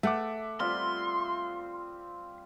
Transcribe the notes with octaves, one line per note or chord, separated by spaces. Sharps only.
A3 E5 F#5 D6
G3 C4 F4 C6